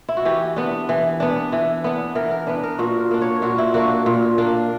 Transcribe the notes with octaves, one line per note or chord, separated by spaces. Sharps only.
E4
F#4
E3 G4
B3 D4
E3
B3 D4
E3
B3 D4
E3 A#4
A#4
B3 D4 B4
A#4
A#2 F#4
A#4
A#3 D4
C#5
A#2 F#4
E4
A#3 D4 F#4
A#2
A#3 D4